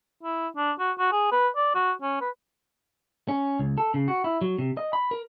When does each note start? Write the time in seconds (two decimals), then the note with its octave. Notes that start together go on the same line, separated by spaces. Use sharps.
0.23 E4
0.56 D4
0.79 F#4
0.99 F#4
1.12 G#4
1.32 B4
1.56 D5
1.75 F#4
2.02 C#4
2.21 B4
3.28 C#4
3.59 C#2
3.78 A4
3.94 C#3
4.08 F#4
4.24 E4
4.41 F#3
4.58 C3
4.77 D#5
4.93 B5
5.11 A#4